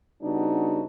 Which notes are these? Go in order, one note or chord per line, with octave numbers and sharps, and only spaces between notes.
C#3 G3 B3 D4 D#4 F#4